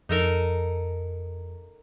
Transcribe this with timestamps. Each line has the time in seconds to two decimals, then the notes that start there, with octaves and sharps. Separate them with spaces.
0.09 F2 D#4 A4 A#4